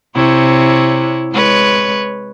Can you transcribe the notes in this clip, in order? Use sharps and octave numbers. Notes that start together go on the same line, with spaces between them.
C3 E4 C#5
G#3 B4 C#5